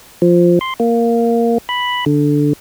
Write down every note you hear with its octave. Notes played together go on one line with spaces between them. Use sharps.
F3
C6
A#3
B5
D3